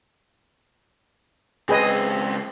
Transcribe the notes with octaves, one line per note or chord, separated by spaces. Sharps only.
C#2 C4 G#4 B4 D#5